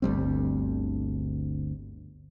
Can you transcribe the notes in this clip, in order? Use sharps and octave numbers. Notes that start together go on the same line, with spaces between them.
G1 D2 G3 C4